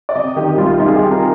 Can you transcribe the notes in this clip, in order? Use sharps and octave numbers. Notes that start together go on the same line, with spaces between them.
D5
C3 D#5
D#3 G4
G4
C2 F4
C2 D#4
G#4
G4
C3
A#4